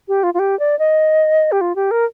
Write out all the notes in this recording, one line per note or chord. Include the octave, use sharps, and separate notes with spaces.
G4
F4
F4
G4
D5
D#5
G4
F4
G4
A#4